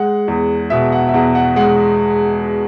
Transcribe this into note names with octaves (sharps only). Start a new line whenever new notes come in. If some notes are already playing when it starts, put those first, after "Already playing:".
Already playing: G#3 F#5
E2
B2 E5
F#5
E5
E2 F#5
F#5
G#3 F#5